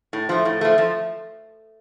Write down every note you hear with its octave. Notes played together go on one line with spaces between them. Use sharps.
A2
F3 A3
A2
F3 A3
F3